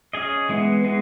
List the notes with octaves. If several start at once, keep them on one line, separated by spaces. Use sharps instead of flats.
C#4 G#4 D#5
E3 G#3 B3
E3 G#3 B3